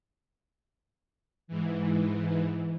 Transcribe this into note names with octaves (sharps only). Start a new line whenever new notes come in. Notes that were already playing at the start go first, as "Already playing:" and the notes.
G#2 E3